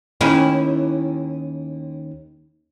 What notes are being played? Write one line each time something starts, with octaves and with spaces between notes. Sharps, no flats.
D#2 C#4 E4